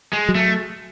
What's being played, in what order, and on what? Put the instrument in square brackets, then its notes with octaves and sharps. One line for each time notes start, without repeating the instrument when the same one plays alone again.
[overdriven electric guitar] G#3
[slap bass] F#3
[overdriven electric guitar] A3